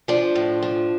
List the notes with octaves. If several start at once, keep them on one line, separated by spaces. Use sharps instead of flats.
F3 D4 F4
A2
F3